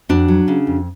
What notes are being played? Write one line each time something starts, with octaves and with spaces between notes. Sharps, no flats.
F2 D4 F#4
F#3
C#3
F2